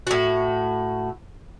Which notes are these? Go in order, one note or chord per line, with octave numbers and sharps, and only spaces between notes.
A2 F#4